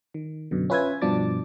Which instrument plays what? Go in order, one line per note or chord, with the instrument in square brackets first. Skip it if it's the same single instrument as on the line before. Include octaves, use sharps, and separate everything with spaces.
[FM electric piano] D#3
F#2 B2 D3
C#4 F4 B4 E5 G#5 G#6
G2 B2 F3 D4 D6 A6